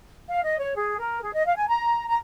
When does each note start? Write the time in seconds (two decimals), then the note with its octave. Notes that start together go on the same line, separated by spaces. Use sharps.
0.29 F5
0.44 D#5
0.59 C#5
0.75 G#4
0.98 A#4
1.22 G#4
1.33 D#5
1.45 F5
1.56 G#5
1.68 A#5
2.08 A#5